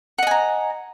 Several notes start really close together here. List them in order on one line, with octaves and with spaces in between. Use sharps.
F#5 D#5 G#5 A#5